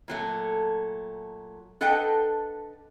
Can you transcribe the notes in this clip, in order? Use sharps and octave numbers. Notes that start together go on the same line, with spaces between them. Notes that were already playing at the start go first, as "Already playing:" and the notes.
A#2 F#3 A3
D4 A4 B4 D#5 F#5 G5